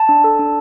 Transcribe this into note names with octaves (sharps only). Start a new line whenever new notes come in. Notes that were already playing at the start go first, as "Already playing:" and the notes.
Already playing: A5
D4
A4
D4